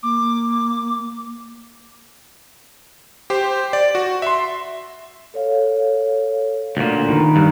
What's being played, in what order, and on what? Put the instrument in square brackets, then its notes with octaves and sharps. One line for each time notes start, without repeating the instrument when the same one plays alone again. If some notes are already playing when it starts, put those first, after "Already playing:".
[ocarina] A#3 [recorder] D6
[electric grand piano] G4 C5
D5
F#4
E5 C6
[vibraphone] A4 C#5 F5
[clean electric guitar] D2 A#2
[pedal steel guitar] D#3 B4 [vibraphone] A#5
[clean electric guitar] G2